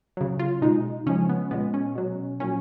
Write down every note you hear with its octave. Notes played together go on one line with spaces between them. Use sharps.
C#3 F#3
F4
B2 G#3 D#4
C#3 F3 G#3 C#4
B3
A#2 G#3 B3
C#4
B2 F#3
A#2 F#3 C#4